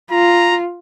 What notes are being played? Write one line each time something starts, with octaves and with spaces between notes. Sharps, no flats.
F4 A#5